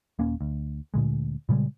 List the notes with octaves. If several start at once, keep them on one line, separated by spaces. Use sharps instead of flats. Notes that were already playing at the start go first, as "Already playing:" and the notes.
D#1 A#3 C#4
D2
D2 A#2 D3 G#3
A#2 C#3 G3 G#3